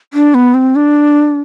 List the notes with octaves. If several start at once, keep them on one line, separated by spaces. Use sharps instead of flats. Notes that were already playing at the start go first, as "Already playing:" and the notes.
D4
B3
C4
D4